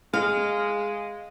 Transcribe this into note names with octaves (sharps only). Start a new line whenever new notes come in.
G#3 F5